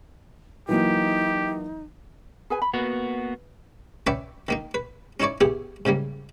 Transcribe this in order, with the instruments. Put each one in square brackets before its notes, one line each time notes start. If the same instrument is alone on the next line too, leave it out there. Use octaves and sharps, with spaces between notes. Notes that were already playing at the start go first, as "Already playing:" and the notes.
[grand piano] E3 F#3 A#3 [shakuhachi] D#4 [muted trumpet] G4
[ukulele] G#4 B4 G#5
B5
[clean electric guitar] A#3 B3 F#4 [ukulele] B4
[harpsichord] C#4 B4 D5 E5 G5
D#3 A#3 D#4
B4
C#4 D#4 E4 C#5 D5
B3 E4 G4 G#4
G#2 C#3 G3 A#3